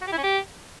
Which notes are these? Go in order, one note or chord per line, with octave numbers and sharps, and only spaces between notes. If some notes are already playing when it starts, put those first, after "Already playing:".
F#4
G4
E4
C#4
G4